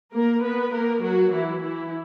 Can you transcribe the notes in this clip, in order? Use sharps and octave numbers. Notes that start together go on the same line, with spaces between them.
A#3 A#4
B3 B4
A#3 A#4
F#3 F#4
E3 E4
E3 E4